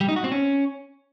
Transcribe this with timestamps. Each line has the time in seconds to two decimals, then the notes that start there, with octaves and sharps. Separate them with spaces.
0.01 G3
0.08 D#4
0.16 F#4
0.24 C4
0.32 C#4